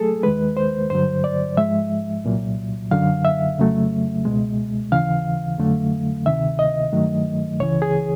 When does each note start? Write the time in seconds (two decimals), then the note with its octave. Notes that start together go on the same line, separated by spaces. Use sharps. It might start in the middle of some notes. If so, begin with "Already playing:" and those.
Already playing: F#3 A3 G#4 A4
0.23 D#2 D#3 G#3 B4
0.57 C5
0.90 G2 D3 F#3 C5
1.24 D5
1.57 G#2 F3 G#3 E5
2.24 C2 A#2 F#3
2.91 F#2 D3 F#3 F5
3.25 E5
3.58 F2 C#3 F#3 A3
4.25 C#2 B2 G#3
4.92 D#2 C#3 E3 F5
5.59 F2 D3 F#3 A3
6.26 D2 C3 D#3 E5
6.59 D#5
6.93 G2 D#3 F#3 A3
7.60 C#2 C#3 E3 C#5
7.82 G#4